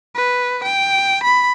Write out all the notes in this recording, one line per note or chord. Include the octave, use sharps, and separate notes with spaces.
B4
G5
B5